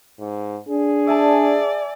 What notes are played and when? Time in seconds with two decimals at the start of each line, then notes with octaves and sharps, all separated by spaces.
0.19 G#2
0.68 D4 G#4
1.07 D5 E5 G#5 A5